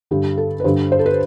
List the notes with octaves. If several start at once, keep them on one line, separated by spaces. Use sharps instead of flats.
G2 D3 G3 G4
A4
B4
G2 D3 G3 C5
C5
A4
B4